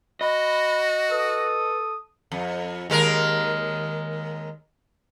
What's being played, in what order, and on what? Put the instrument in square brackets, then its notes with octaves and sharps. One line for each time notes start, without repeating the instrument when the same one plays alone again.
[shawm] F#4 [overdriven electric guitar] D#5 [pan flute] B5
[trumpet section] A4 D#6 [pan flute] B4
[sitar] F2
D#2 G#3 A#4